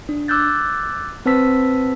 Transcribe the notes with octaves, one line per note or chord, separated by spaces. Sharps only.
D4
D6 E6 F#6 G6 A6
C4 B4 C5 A5 E6 B6